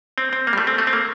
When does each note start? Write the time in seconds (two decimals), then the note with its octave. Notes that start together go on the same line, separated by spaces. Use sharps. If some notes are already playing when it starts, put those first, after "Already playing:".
0.18 C4
0.33 C4
0.47 A#3
0.53 G3
0.58 A3
0.67 C4
0.78 A3
0.87 C4
0.93 A#3